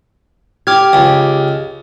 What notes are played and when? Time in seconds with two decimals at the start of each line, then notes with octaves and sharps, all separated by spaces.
0.67 G4 D6 F6 G#6
0.93 C#2